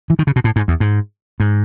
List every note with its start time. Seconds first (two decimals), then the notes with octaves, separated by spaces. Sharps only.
0.10 E3
0.19 D#3
0.27 C#3
0.36 B2
0.44 A2
0.56 G#2
0.68 E2
0.80 G#2
1.40 G#2